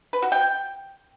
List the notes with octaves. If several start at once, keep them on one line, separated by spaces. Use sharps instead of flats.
B4
F#4
G5